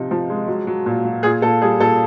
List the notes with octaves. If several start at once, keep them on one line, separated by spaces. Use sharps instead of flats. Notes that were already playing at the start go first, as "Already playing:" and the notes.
Already playing: C3 F3 D#4
F3
G#3
F#3
F#3
A#2
F#3
A#2 G#4
A#2 A4
G3 G#4
A#2 A4